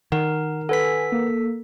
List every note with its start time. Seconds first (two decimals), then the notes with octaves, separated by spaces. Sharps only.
0.12 D#3 A#4 F#5
0.69 A4 B4 F#5 G#5 B6
1.12 A#3